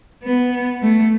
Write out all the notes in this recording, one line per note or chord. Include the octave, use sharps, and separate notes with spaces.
B3
A3